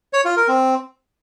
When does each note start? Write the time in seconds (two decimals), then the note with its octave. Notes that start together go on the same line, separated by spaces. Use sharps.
0.13 C#5
0.25 F4
0.37 A#4
0.48 C4